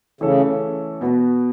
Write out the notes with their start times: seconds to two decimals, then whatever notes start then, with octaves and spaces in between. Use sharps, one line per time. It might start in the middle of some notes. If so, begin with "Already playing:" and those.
0.21 C#3 E3 A3 C#4 A4
1.01 B2 B3 F#4 B4